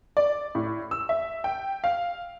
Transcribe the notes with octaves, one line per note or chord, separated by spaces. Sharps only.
D5
A2
E6
E5
G5
F5